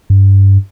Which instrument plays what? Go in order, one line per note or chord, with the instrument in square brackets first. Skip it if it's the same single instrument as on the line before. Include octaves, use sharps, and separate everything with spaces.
[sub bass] G2